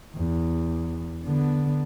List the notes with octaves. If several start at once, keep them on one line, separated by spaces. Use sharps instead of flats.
E2
D3 B3